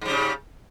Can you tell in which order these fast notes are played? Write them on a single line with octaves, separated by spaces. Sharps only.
G#2 G3 C#3